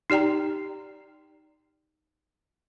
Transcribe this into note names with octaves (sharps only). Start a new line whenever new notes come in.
D#4 G4 D5 G5 A#5